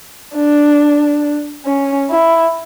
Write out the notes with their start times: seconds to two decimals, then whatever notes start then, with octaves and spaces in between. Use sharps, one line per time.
0.35 D4
1.66 C#4
2.10 E4